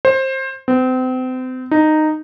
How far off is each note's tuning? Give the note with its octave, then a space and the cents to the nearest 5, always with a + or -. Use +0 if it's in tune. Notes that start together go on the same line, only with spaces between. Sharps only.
C5 +20
C4 -35
D#4 -10